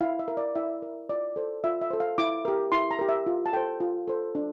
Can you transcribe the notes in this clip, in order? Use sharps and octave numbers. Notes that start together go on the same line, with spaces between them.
E4 F5
E5
A#4
D5
E4 E5
A#4
F4 D5
A4 C5
F4 E5
E5
A4 C5
F5
E4 D6
G4 A#4
E4 C6
A#5
G4 A#4
E5
F4
A5
A4 C5 G5
F4
A4 C5
D4